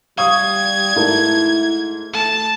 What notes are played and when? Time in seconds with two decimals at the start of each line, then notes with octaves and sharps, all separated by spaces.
0.18 G3 F5 C#6 D#6 G#6
0.96 G#2 A3 E4 A#4
2.13 A3 A5